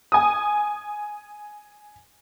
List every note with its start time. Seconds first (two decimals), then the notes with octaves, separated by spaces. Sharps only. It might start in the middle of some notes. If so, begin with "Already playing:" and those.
0.12 G#5 D#6